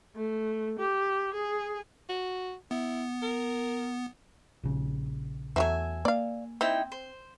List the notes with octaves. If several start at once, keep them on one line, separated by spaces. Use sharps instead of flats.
A3
G4
G#4
F#4
B3 E4
A#4
A#1 C#3
E2 F3 F#3 A3 E5 G#5
A#3 D5 F5
C4 D#4 E4 G5
C5